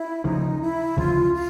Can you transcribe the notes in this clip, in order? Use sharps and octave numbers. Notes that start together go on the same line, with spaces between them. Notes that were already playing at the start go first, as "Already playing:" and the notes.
Already playing: E4
D2 C#3 F3 D#4
E4
D2 C#3 F3 F4
F4